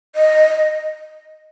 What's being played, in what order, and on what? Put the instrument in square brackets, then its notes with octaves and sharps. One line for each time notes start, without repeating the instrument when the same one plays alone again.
[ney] D#5